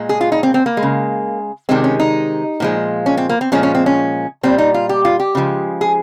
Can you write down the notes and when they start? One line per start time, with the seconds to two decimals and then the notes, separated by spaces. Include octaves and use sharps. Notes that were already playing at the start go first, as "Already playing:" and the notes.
Already playing: A#2 G#3
0.09 G#4
0.21 F4
0.32 D#4
0.43 C4
0.54 C4
0.66 A#3
0.77 G#3
0.83 C#3
1.69 C3 D#3 G#3 C4
1.84 C#4
2.00 D#4
2.60 A#2 F3 G#3
3.06 C#4
3.17 C4
3.29 A#3
3.41 C4
3.52 A#2 F3 G#3 C#4
3.63 C#4
3.75 C4
3.86 C#4
4.43 A#2 G3 C4
4.58 D#4
4.74 F4
4.89 G4
5.05 F4
5.19 G4
5.35 C#3 F3 G#3
5.81 G#4